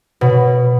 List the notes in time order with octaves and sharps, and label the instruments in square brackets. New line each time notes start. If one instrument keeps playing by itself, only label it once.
[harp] B2